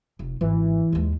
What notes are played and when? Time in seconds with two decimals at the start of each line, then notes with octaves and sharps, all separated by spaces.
0.19 F1
0.41 G#1 E3
0.92 D#2 G#3